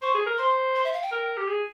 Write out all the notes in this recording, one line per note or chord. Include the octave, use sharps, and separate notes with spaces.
C5 C#6
G#4
A#4
C5 C6
C6
E5
F5
G5
A#4
G4
G#4